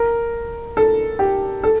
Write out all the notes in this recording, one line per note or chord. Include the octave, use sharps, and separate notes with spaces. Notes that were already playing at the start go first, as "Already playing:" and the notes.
Already playing: A#4
A4
G4
A4